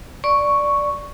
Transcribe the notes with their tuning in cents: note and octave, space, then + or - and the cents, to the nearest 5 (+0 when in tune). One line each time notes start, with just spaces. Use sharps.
D5 +0 C#6 +0